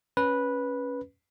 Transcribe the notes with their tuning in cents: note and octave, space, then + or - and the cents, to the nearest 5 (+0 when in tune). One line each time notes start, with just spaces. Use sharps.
C#4 +0 B4 -10